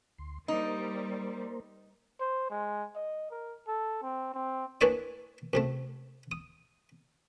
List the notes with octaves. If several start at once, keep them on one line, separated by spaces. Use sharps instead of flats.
D2 C6
G3 A#3 D#4 A#4 C5
C5
G#3
D#5
A#4
A4
C4
C4
E3 A#3 D4 C#5 D5 D#6
F#2 C3 A3
D#6